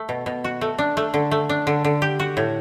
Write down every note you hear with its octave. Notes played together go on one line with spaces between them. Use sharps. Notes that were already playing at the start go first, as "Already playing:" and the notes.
Already playing: A3
B2
B2
F#4
A3
D4
A3
D3
A3
D4
D3
D3
G4
F#4
A2